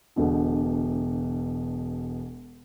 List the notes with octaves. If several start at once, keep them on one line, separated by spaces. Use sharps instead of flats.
E1 B2 D3